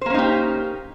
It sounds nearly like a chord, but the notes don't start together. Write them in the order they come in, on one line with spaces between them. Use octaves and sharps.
C5 A#3 C#4 D#4 G4